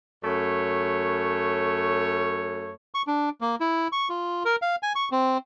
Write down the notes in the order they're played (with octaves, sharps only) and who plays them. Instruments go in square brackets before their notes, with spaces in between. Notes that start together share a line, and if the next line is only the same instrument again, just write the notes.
[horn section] F#2 A3 C#5
[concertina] C#6
D4
A#3
E4
C#6
F4
A#4
F5
G#5
C#6
C4